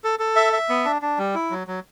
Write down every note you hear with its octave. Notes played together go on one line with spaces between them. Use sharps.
A4
A4
E5
E5
B3
D4
D4
G3
E4
F#3
F#3